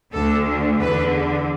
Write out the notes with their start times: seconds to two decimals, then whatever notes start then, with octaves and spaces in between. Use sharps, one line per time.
0.13 D2 D3 A4
0.80 E2 D3 B4